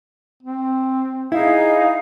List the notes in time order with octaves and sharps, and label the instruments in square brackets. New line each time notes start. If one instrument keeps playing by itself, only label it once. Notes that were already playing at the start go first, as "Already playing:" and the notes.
[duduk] C4
[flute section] D#4 F5 [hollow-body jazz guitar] E4 [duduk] G#4